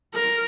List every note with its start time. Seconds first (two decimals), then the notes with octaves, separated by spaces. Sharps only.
0.15 A#4